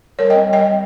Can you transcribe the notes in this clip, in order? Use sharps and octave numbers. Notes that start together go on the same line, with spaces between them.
G3 A#4 C#5
D#5 G5
C4
G3 D#5 G5
G3